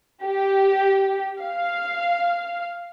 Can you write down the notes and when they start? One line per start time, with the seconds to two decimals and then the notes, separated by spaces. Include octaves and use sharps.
0.24 G4
1.42 F5